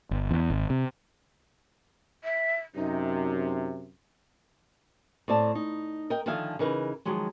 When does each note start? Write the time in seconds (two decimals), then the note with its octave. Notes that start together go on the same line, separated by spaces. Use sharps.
0.11 G1
0.31 E2
0.50 G#1
0.70 C3
2.24 E5
2.76 F#2 C3 D#4
5.28 A2 C4 D5 A5
5.55 D#4
6.10 A#4 D#5 G5
6.26 D3 D#3 F3 E5 F5 G#5
6.59 C#3 E3 D#4 A#4 B4
7.05 D#3 F3 F#3 G#3